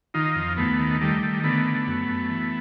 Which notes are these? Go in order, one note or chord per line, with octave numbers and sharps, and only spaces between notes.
D#3 D#4 F4
F2
D#2 A3 B3
D#3
D#3 G3 A3
D#3
D3 A3 B3
D3
F#2
F#2
E3